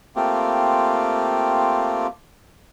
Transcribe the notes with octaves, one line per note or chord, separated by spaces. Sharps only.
A3 A#3 C4 F4 G4